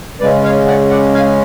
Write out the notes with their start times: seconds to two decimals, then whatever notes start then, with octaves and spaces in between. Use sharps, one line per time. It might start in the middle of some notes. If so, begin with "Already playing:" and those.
0.20 C#3 G#3 C#4 B4 D5
0.43 C#5 F5
0.67 D5 F#5
0.90 D5 F#5
1.14 F5 G#5